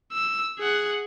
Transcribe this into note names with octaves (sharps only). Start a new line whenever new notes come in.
E6
G#4 F#5